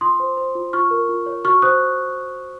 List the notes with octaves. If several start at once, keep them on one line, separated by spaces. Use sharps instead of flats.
F4 C6 D#6
C5
C5
F4
F4 C#6 F6
A#4
F4
C#5
F#4 C#6 F6
C5 D#6 F#6